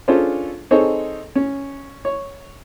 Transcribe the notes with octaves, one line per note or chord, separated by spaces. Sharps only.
C#4 D4 F4 G#4 A4 C5
C4 D#4 G#4 A4 C5 C#5
C#4
C#5